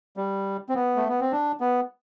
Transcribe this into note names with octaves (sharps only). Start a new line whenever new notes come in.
G3
C4
B3
A3
B3
C4
D4
B3